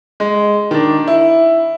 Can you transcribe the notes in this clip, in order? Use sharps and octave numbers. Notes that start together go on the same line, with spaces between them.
G#3
D#3 D4
E4